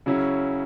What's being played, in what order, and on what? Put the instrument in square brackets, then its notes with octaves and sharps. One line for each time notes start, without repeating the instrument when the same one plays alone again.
[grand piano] C#3 F#3 C#4 E4